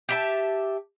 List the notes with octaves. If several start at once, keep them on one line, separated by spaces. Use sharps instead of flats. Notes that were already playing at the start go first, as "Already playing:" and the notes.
G4 E5 A5